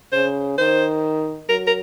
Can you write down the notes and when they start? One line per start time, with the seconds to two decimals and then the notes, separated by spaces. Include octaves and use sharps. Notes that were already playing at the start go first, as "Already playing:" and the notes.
0.12 C#3 C5
0.58 D#3 C5
1.49 F#3 A#4
1.67 A#4